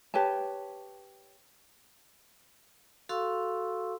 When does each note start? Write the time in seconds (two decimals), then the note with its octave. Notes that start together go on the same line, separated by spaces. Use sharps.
0.14 G4 B4 C#5 A5
3.09 F#4 A4 F5 C6 C#6 E6